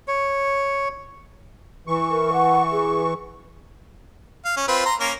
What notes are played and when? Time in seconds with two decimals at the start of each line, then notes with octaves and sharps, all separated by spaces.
0.08 C#5
1.87 E3 C#6
2.11 A#4
2.33 F#5
2.72 G#4
4.45 F5
4.57 C#4
4.68 C4 F4 B4
4.86 A#5 C6
5.00 A#3 C#4 A#4